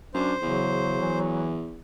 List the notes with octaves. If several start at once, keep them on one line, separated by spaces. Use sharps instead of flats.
F#2 D4 C5
E2 C#3 F#3
E3